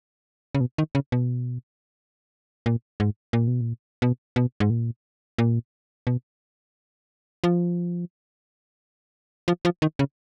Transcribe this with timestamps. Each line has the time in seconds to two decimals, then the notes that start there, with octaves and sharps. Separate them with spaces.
0.55 C#3
0.61 B2
0.78 D#3
0.95 C#3
1.12 B2
2.66 A#2
3.00 G#2
3.33 A#2
3.48 B2
3.61 A#2
4.02 B2
4.36 B2
4.60 G#2
4.70 A#2
5.38 A#2
6.07 B2
7.44 F3
9.48 F3
9.65 F3
9.82 D#3
9.99 C#3